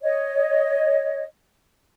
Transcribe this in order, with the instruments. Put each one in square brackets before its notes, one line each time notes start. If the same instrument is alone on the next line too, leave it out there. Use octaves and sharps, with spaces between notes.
[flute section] C#5 D#5